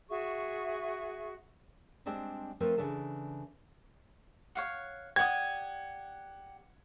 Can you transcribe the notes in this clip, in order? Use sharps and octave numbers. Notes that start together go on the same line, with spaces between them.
F#4 G#4 E5 C#6
G3 G#3 C4 D4 C5
F3 A3 C4 A#4 B4
C#3 E3 D4 A4
C#5 F5 F#5
G4 D5 F#5 D#6 G#6